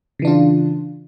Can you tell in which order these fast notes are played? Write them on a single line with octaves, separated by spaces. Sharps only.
C#3 E3 D4 F4